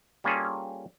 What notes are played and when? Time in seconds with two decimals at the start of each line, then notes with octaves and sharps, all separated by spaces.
0.24 G3 A#3 C#4 F4 G#4 A4